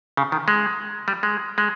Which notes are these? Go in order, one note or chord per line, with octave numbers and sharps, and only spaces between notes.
C#3
D#3
G#3
G3
G#3
G#3